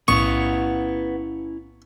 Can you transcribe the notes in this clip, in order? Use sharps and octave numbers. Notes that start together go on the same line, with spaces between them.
B1 A2 B3 C#4 E4 F5 C#6 D#6